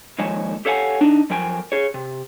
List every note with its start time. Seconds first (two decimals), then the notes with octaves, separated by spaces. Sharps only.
0.19 D#2 F3 G#3 C#5 G#5 A5
0.65 G4 A4 C#5 F5 F#5 G#5
1.01 E3 D4 D#4
1.30 F#2 F3 A#4 G5 G#5
1.72 G#4 C#5
1.94 C3